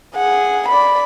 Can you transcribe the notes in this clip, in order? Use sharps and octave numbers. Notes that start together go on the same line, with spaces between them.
G#4 F#5
D5 B5